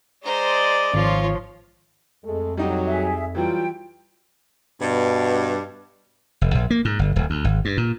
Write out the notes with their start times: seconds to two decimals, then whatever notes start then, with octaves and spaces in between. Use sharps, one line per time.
0.24 G#3 C5 D5 D#5 A#5
0.94 G#1 F3 F4 C#5
2.24 F2 G#3 A3 A4
2.57 F#3 G3 D#4 G4
2.88 G#4 E5
3.35 E3 F#3 G3 F4 G5
4.81 G2 B2
6.41 F1
6.55 A#1
6.70 A#3
6.85 G#2
6.99 G1
7.16 D1
7.30 D2
7.44 G#1
7.65 G2
7.77 A#2